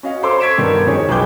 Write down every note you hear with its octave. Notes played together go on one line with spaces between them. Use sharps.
C#4 F#4 D#5 F5
A4 C5 C#5 C6 D6 E6
C#6 G#6 B6 D7 E7
G2 D#3 B3 D#4
F2 D#3 C#4 G#4 C#5
B1 G#4 B4 G5 D6 G6